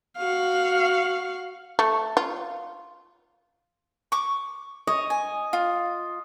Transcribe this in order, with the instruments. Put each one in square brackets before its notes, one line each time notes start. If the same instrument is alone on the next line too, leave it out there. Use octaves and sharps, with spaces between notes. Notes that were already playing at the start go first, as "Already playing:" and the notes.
[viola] F#4 F5
[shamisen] A3
F4
[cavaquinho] C#6 D6
[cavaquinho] C#5 [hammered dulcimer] D#5
[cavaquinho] G#5
F4